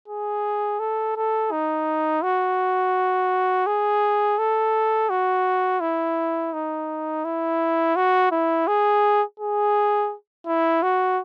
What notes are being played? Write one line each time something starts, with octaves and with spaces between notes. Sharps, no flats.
G#4
A4
A4
D#4
F#4
G#4
A4
F#4
E4
D#4
E4
F#4
E4
G#4
G#4
E4
F#4